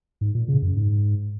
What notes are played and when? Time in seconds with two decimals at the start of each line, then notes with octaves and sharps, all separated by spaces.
0.21 G#2
0.35 A#2
0.48 C#3
0.62 F#2
0.76 G#2